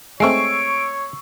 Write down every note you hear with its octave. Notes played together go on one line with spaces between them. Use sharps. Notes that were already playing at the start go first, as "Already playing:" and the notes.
G#3 A3 C4 C#5 C#6 E6 C7 D7